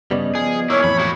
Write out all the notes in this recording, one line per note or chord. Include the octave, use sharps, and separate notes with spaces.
G2 C#3 G3 B3 D5 D#5
F3 G#4
A#3 E4 C#5 C#6 F6 G#6
F2 A2 E3 B5
E4 F#4